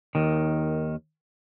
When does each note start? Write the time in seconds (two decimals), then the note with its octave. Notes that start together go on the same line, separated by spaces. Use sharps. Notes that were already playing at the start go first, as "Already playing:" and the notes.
0.15 D#2 D#3